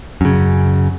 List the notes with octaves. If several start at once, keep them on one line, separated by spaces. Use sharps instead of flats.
F#2 C#3